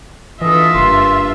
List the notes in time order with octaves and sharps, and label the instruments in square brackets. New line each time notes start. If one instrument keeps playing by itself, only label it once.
[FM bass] E3 [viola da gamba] D4 A4 B4 [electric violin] F4 E5 [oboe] D#5
[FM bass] F#1 [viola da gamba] G2 A#3 D4 [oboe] C6